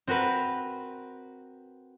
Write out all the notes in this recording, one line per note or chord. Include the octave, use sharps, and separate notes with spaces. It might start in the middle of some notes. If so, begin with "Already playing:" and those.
C4 F#4 A#4 B4